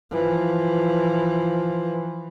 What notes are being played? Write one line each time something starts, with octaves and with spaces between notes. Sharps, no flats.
E3 F3